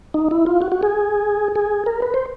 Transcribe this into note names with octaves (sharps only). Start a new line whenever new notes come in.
D#4
E4
F4
F#4
F#4
G#4
G#4
A#4
B4
C5